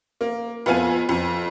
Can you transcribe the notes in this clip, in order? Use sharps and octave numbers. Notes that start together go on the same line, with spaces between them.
A#3
F2 B3 F4 G#5 D#7
F2